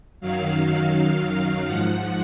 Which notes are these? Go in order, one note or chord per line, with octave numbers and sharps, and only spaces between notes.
F#2 D#3 F#3 F5
F5
F#2 D#3 F#3
G#2 F3 F#5